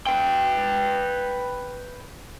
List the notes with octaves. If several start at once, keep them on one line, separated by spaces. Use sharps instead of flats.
B4 G5